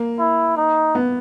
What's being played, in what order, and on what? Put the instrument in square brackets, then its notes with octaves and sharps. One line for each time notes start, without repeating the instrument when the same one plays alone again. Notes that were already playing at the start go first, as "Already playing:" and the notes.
Already playing: [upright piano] A#3
[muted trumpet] E4
D#4
[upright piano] B3